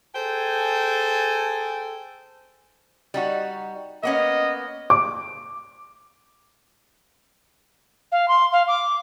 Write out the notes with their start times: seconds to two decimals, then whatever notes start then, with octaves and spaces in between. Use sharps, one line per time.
0.15 G#4 A4 C5 G5 G#5
3.14 G3 D#4 F#4
4.03 A#3 B3 C#4 D#5
4.90 D6
8.12 F5
8.28 C6
8.52 F5
8.68 D6